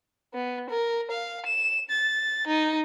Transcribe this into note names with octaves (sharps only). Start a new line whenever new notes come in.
B3
A#4
F5
E7
A6
D#4